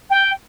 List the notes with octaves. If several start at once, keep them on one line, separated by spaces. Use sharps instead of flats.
G5